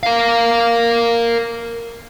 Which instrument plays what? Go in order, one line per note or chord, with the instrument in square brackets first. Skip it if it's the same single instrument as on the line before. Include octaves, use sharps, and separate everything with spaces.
[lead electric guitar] A#4 F5